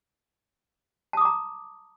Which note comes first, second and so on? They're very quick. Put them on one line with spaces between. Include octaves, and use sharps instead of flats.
A5 D#6 D6 A#5